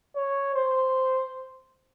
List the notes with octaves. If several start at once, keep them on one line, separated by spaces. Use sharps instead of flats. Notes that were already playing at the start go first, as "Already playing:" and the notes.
C#5
C5